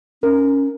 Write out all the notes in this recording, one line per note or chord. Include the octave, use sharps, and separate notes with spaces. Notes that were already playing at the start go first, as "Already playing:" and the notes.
C#4 A#4